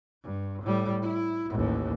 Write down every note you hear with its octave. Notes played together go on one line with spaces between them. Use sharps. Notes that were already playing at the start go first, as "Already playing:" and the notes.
G2
A2 G3
E4
A1 D#2